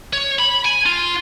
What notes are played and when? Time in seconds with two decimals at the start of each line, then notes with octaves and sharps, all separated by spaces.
0.13 C#5
0.39 B5
0.65 G#5
0.86 F4